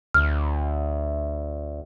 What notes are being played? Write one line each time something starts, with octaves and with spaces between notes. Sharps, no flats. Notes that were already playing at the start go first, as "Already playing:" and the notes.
D2 F6